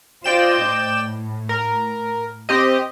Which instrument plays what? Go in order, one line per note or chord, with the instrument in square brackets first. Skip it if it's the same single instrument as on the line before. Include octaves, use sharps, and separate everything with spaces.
[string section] F4 C5 D#5 [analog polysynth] D5 G5 E7
[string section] A2
[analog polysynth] A#4
C4 G4 D#5